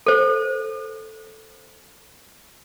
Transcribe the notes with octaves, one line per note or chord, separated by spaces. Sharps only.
A4 C5